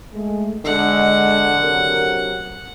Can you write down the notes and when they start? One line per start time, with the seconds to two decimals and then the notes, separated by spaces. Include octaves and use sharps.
0.13 G#3 A3
0.65 D3 G#3 D#5 F#5
1.58 C3 F#3 A#4